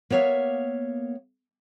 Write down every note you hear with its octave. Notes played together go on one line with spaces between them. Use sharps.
A#3 B3 C#5 E5 F5